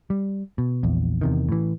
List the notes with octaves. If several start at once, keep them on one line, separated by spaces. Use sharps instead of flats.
G3
B2
A#1 E2
E2 C3 D#3
A2 E3